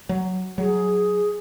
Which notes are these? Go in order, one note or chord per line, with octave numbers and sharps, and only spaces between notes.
F#3
F#3 G#4